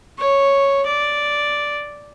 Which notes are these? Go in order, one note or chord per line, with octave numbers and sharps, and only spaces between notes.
C#5
D5